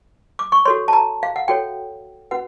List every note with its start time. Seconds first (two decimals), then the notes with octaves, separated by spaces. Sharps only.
0.39 D6
0.52 C#6
0.65 F#4 A4 C#5 C6
0.88 A5
0.93 A#5
1.23 F5
1.36 F#5
1.48 F#4 A4 C#5 G5
2.31 C#4 F#4 B4 F#5